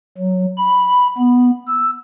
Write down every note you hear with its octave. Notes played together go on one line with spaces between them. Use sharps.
F#3
B5
B3
E6